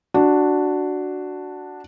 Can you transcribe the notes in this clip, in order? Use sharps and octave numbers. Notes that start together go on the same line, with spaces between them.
D4 F#4